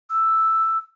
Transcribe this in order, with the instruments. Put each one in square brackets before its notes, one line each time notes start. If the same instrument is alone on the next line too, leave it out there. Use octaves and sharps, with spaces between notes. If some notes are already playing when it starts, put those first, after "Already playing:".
[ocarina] E6